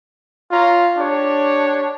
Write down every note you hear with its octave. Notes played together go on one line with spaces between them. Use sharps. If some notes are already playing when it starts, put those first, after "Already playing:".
F4 C#5 A#5
D4 G4 C#5